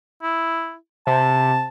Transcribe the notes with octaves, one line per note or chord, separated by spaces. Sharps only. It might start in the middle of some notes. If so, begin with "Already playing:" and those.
E4
C3 A5